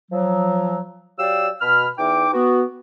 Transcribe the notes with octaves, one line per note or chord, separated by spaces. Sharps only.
F3 F#3
F#3 G4 D5 F5 G5 E6
B2 B5 F6
E2 D#4 E5 G5 D6
B3 F#4